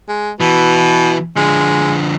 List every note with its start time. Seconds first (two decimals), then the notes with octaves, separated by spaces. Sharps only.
0.09 G#3
0.40 B2 E3
1.37 D3 F3 G#3